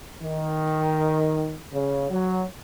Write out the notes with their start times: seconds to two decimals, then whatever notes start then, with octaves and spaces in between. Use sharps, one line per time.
0.23 D#3
1.72 C#3
2.10 F#3